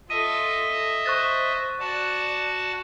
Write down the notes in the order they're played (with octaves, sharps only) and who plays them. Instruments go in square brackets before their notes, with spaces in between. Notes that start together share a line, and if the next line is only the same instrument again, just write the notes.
[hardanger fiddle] F4 A4 [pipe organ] D#5 E5 [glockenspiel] D#7
[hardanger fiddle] C5 [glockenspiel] C#6 F#6 A6
[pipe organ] F#4 A5 [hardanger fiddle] D5